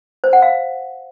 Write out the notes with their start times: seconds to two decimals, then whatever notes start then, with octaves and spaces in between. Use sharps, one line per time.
0.24 C5
0.33 F#5
0.42 F5